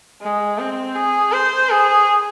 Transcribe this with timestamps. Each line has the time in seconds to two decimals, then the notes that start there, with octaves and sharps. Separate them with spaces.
0.22 G#3
0.59 C4
0.95 G#4
1.32 C5
1.70 G#4